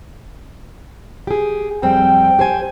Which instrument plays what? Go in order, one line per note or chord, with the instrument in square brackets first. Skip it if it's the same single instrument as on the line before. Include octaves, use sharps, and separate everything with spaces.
[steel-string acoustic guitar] G4 G#4
[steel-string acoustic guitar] F2 G3 C4 [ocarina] G5
[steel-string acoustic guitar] G4 C5 G#5